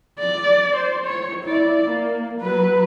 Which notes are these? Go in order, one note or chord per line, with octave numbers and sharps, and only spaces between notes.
D5
C5
C#5
E4 D5
A#3
F#3 B4